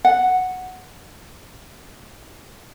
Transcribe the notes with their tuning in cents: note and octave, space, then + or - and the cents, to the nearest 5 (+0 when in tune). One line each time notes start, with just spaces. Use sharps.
F#5 -5